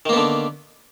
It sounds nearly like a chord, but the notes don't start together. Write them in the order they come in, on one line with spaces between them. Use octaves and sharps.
D#3 A#3 B3 D3